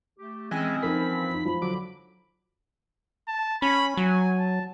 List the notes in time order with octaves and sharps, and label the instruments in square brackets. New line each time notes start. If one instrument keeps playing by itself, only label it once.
[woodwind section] A3 G4
[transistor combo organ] E3 G#3 [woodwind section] C4 C#4 [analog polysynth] D#5 G#5
[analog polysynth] E3 F3 [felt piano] D#4 A#4 [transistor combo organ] B5
[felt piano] D#4
[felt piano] F3 [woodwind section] B5
[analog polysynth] D3 F#3 [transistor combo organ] D6
[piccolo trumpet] A5
[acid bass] C#4 [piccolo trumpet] B5
[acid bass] F#3 [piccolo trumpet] G#5
[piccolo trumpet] A5